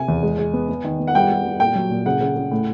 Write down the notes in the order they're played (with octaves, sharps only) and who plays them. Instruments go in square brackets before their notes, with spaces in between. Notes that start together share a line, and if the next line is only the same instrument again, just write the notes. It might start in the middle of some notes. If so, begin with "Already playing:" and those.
Already playing: [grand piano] C3 [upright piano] G#5
[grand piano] E2
G#3
G#3
B3
B3
D#3
B3
[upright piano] F#5
[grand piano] G3 [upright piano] G5
[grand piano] G3
G3
[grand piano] A#2 [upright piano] G5
[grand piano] F#3
A#2
[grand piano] C#3 [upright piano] F#5
[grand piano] C#3
C#3
A2